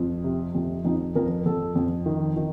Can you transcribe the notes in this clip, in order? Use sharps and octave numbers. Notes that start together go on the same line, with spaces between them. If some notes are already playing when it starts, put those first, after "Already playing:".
Already playing: F2
C3
F2
F2 D#4
F2 A#4
F2 A4
F2
D#3
D#3